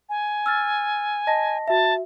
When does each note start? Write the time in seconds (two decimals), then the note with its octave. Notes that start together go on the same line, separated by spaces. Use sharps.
0.09 G#5
0.46 E6 F6 A6
1.27 D#5 A5 A#6
1.68 F#4 E5 A5